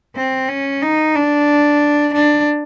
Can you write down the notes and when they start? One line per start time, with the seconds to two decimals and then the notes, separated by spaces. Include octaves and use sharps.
0.16 C4
0.49 C#4
0.82 D#4
1.15 D4
2.14 D4